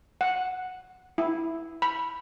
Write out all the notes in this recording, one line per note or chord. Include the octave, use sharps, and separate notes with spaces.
F#5
E4
B5